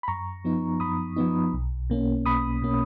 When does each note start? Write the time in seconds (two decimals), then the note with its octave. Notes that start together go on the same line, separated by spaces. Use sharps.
0.03 B5
0.08 F#2 A#5 C#6
0.45 F3 B3 D#4
0.80 F#2 B5 D#6
1.16 F3 B3 D#4
1.53 B1
1.90 B2 A#3 C#4
2.26 B1 B5 D#6
2.62 B2 A#3 C#4